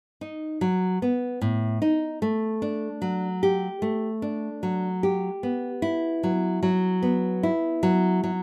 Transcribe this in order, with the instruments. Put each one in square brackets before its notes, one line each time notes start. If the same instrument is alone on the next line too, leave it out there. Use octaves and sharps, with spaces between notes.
[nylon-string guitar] D#4
F#3
B3
A2
D#4
A3
D4
F#3
G4
A3
D4
F#3
G4
B3
E4
F#3
F#3
B3
E4
F#3
F#3